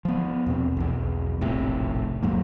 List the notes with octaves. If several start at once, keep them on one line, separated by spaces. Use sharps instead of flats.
F3 B3
E2 B2 C4
B1 E2
F1 A#1 A2 C3
D#2 G#2 F#3 A#3